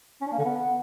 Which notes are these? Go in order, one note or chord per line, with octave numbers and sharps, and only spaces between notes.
C#4
D4
A#3
D3
B3